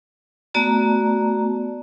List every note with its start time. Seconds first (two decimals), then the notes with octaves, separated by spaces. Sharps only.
0.54 A3 B3 F#4 D5 A5 A#5